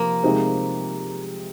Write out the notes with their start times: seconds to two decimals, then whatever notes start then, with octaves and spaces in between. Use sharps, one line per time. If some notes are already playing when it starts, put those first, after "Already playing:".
Already playing: C3 F3 A#3
0.24 C3 G#3 C4 D#4 C5